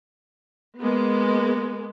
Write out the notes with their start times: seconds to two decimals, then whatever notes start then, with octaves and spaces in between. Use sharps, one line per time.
0.78 G#3 A#3 B3